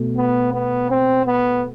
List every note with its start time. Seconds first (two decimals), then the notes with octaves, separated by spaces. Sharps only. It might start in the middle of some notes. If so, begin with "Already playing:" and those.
Already playing: B2 A3
0.17 B3
0.53 B3
0.90 C4
1.26 B3